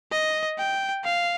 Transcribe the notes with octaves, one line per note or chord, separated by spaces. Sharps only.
D#5
G5
F5